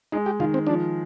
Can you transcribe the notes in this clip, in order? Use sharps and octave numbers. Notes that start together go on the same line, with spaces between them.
G#3 D#4
G4
D#3 F4
C4
F3 D4